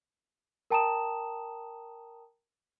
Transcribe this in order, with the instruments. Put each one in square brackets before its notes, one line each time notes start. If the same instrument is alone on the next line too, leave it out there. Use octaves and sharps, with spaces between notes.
[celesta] A#4 G5 A5 A#5 D#6 E7